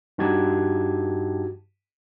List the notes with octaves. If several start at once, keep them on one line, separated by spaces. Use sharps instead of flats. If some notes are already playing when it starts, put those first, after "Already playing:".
G2 D#4 F#4 G4 A5 G#6